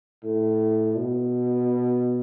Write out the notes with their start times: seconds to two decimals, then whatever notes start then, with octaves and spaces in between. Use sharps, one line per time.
0.23 A2
0.96 B2